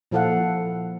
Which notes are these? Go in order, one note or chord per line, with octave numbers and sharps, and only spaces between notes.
A#2 F3 E4 A4 F5 F#5